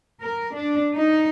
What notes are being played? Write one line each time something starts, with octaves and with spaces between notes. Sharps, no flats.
A#4
D4
D#4